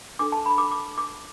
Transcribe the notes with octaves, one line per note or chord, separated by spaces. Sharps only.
D4 A4 D6
A5
B5
D6
D6
D6